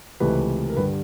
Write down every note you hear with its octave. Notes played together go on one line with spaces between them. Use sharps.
C#2 C3 E3 A3 B4
A#4
G2 D3 G3 B4